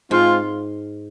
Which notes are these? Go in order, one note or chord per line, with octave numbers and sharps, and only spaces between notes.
G#2 G#3 C4 F4